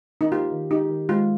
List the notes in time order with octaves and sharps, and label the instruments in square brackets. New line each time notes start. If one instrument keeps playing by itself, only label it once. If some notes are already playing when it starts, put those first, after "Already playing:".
[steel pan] D#4
[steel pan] F4 [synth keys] G4
[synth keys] D#3
[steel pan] D#4 [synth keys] G4
[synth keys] D#3
[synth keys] G#3 [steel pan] F4